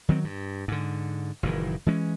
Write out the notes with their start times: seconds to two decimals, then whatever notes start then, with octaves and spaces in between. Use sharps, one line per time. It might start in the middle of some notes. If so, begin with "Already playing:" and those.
0.09 D#3 F#3 C4
0.24 G2
0.68 G#2 D3
1.43 F#1 A#2 D#3 E3
1.86 E3 G#3 C#4